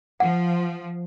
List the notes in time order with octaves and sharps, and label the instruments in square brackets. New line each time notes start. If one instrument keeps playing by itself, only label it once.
[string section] F3 [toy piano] F#5